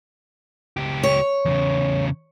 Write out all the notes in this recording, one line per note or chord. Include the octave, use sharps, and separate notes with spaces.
C#2 G4
C#5
E2 C#3